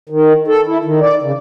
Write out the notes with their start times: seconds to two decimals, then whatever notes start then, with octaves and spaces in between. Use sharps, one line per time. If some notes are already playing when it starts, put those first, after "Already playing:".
0.09 D#3
0.48 A4
0.67 E4
0.85 D#3
1.01 D5
1.22 C#3